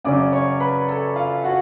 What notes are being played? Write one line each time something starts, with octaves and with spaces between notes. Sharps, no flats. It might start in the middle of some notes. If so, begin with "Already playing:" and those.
F#2 C#3 F#3 C#4 D5 D6
C#5 C#6
B4 B5
A4 A5
F4 F5
F#4 F#5